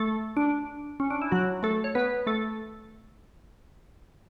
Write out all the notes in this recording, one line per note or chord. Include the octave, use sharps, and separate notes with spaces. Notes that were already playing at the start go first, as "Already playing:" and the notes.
Already playing: A3 A4
D4
C#4
D4
E4
F#3 F#4
A3 A4
C#5
B3 B4
A3 A4